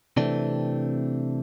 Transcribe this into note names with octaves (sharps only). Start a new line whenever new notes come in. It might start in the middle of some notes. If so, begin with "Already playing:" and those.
C3 E3 A3 C4 D4